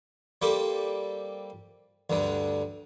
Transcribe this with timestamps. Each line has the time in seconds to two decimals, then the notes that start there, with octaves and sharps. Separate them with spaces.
0.42 G3 A#3 C4 G4 A4
2.10 D2 G2 D3